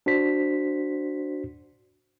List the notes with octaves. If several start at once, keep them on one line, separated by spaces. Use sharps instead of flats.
D4 F#4 C5 B6